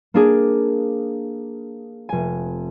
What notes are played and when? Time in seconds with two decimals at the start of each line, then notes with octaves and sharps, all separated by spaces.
0.14 A#3 D4 G#4
2.09 F1 G#5